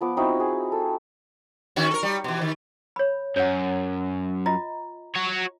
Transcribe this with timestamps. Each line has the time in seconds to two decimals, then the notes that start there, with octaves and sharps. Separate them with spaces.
0.01 F3 B3 D6
0.17 C4 D#4 E4 F#4
0.40 C4 G#4
0.72 A4
1.76 D#3 C#4 F#4
1.91 A4 A#4
2.03 G3
2.24 B2 E3
2.41 D#3
2.96 C#5 B5
3.36 F#2 C#5 F#5
4.46 F4 D#5 A#5
5.15 F#4 C#5